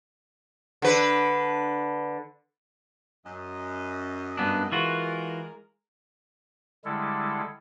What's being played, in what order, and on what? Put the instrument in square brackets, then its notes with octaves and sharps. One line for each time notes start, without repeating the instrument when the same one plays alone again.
[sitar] D3 B4
[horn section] F#2 D#5
[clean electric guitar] G2 B3 D4
[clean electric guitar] E3 F4 F#4 [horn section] G#3 A#4
[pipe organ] D3 G3 G#3 E4 A4